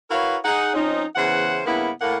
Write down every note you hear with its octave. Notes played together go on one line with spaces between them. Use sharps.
E4 F#4 A#4 B4 C#5 F5
D#4 G#4 F#5
F3 C4 C#4 D#4
E2 C#3 E3 C5 F#5
G2 C#3 A#3 B3 E4
A2 A#3 F#5